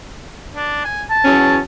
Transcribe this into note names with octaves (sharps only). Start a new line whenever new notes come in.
D4
G#5
A5
E2 F#3 C#4